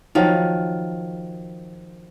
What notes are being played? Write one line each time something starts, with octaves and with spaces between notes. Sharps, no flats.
D#3 F3 F#3